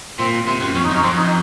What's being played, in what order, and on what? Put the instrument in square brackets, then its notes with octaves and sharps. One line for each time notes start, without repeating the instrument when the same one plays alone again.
[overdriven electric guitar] A#2 [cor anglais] C4
[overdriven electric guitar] C3 [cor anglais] C4
[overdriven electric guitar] F#2
[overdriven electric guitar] F2 [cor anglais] C#4
[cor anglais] D#4
[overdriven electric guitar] F#2 [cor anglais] C#4
[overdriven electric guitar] F2 [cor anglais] C4
[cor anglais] D#4